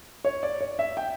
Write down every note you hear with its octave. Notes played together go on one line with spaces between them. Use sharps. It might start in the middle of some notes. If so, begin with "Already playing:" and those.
C#5
D5
C#5
E5
G5